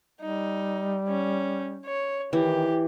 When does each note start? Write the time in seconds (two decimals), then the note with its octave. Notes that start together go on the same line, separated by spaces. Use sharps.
0.22 G3 D#4
1.08 C#4
1.86 C#5
2.33 D#3 E3 G4